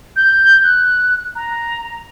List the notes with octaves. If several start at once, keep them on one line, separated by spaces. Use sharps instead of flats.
G6
F#6
A#5